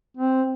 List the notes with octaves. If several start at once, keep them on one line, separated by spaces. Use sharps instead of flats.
C4